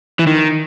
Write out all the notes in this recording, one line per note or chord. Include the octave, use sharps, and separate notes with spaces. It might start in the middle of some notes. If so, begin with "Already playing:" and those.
E3
D#3